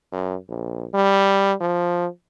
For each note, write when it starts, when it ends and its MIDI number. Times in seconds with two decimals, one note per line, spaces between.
0.12 0.35 42
0.48 0.85 34
0.94 1.53 55
1.60 2.06 53